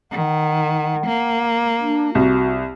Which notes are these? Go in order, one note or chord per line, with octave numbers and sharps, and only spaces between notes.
D#3 F#5
A#3
D4
C2 F#4